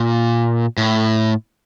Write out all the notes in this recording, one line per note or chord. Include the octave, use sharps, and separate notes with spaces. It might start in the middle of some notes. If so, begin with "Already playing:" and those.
Already playing: A#2
A2